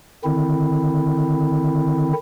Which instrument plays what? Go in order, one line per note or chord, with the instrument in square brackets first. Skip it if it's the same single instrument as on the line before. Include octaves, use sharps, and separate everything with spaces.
[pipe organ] D3 D#3 C4 E4